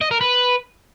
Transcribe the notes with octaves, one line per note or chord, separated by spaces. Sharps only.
D#5
A#4
B4